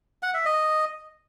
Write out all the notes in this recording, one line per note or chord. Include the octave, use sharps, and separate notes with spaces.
F#5
E5
D#5